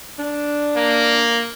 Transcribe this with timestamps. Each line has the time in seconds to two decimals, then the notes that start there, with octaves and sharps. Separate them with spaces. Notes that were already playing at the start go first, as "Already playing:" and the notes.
0.19 D4
0.76 A#3